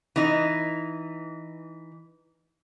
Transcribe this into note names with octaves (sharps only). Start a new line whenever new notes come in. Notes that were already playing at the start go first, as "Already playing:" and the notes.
E3 D#4